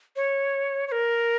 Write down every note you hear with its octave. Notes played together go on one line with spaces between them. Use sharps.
C#5
C#5
A#4